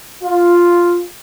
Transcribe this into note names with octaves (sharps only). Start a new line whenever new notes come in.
F4